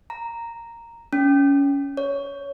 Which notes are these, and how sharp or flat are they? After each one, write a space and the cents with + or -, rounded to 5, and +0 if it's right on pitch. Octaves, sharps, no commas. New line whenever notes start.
A#5 -5
C#4 +20
C#5 +15